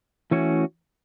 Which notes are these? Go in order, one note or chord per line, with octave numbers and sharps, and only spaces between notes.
E3 A3 C#4 F#4 C#5